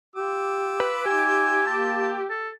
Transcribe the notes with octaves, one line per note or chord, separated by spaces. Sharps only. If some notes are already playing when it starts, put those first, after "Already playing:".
F4 G4 D6 E6
B4
D#4 G4 G#5
A#3 A5
A4